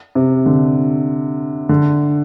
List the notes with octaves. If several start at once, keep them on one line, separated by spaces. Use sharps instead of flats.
C3
D3
D3